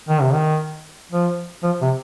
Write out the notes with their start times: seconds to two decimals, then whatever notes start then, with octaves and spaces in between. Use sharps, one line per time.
0.09 D#3
0.21 C3
0.34 D#3
1.12 F3
1.63 F3
1.82 C3